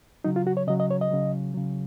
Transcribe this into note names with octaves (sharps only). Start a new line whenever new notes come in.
C#3 F#3 D#4
F4
F#4
C#5
C#3 F#3 D#5
D#5
C#5
D#5
C#3 F#3
C#3 F#3